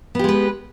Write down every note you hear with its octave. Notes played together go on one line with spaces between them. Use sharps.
G#3 B3 G4 B4